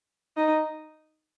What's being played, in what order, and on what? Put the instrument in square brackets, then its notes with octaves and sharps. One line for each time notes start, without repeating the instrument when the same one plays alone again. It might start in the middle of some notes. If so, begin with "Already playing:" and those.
[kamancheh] D#4